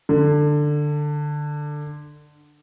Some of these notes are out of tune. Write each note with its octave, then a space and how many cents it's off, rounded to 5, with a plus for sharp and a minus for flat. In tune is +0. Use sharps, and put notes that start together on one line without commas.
D3 +15